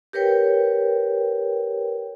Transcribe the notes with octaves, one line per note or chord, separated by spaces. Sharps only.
G4 A#4 B4 C#5 G5